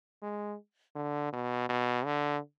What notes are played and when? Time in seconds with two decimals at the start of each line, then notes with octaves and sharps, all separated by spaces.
0.22 G#3
0.95 D3
1.33 B2
1.69 B2
2.05 D3